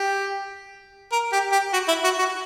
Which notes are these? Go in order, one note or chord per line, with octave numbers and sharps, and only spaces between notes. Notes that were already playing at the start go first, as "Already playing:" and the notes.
Already playing: G4
A#4
G4
G4
F#4
E4
F#4
F#4